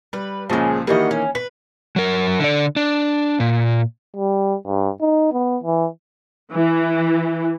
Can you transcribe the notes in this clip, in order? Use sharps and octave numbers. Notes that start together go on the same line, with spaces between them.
G3 B4
C#2 A#2 C#3 F3 G#3
D#3 E3 G3 A#3 F#4 D#5
C#4
B4 B6
F#3 A#4
D3 D5
D4
A#2
G3
G2
D#4
B3
E3
E3